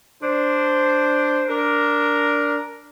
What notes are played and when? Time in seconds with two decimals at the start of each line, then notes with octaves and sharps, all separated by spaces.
0.23 D4 C5
1.49 D4 A#4